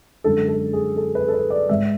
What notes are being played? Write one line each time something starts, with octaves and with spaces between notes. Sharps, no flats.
F#2 D3 G#3 A4
A4
G#4
A4
B4
A4
B4
D5
G#2 G#3 E5